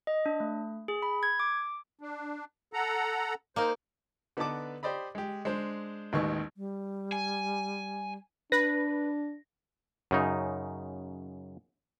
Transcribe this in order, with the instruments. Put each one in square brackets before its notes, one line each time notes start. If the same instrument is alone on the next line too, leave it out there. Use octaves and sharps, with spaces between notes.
[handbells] D#5
D4
A3
G#4
B5
G#6
D6
[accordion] D4
A4 F#5 A#5
[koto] A#3 D#4 A#4 [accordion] C5
[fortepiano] D3 B3 D#4 B4 A5 D6
G4 C5 D5 D#5 B5
G#3 G4
G#3 D4 C5
A1 D#2 D#3 G#3 B4 C#6
[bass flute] G3
[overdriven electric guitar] G#5
[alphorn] D4 [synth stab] B4 [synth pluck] A#6
[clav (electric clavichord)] F#2 C#3 D#4